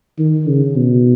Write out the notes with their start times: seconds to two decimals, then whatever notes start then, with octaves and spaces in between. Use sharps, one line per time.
0.18 D#3
0.48 C#3
0.76 B2